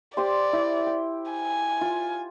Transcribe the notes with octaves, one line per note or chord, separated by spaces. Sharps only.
G4 C5 D5 C6
E4
G5
G#5
F4